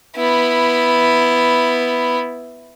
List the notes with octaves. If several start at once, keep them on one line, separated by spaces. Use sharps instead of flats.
B3 E4